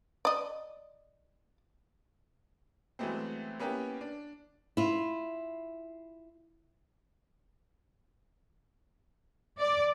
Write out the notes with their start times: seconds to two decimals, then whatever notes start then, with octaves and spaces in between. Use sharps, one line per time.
0.25 D5 D#5
2.99 E3 F#3 G#3 A3 B3 C4
3.60 A#3 B3 C#4 E4 G4
4.01 D4
4.77 E4 F4
9.60 D5